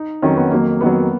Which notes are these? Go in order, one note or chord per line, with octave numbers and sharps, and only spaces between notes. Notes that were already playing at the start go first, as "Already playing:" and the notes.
Already playing: D#4
F2 D#3 F#3 C#4
B3
F2 D#3 F#3 A#3
F2 D#3 F#3 B3